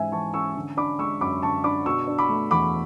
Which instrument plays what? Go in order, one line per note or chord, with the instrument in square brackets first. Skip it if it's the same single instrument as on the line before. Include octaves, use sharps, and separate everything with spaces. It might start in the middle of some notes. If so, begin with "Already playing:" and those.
Already playing: [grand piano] G#2 E3 G#3 C#4 E5 G#5
E3 A5 C#6
C#4 C#6 E6
D3
D4 B5 D6
G#3 C#6 E6
F#2 B5 D6
D3 A5 C#6
D4 B5 D6
B2 C#6 E6
D4
B5 D6
A3
E2 B5 D6